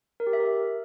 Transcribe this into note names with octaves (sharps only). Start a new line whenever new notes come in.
A#4
G4
E5
A#4